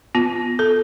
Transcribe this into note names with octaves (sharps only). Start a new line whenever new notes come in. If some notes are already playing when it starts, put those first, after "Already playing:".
B3 F4
A4